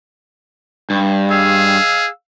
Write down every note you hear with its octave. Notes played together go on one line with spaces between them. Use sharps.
G2
G#4 F5 E6